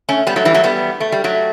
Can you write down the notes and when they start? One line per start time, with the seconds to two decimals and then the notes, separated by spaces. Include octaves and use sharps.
0.09 A3 C#4
0.27 G3 B3
0.36 F#3 A3
0.45 E3 G3
0.54 F#3 A3
0.64 G3 B3
1.00 A3
1.12 G3
1.24 F#3 A3